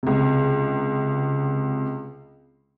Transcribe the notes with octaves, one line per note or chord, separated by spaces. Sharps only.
C#2 C3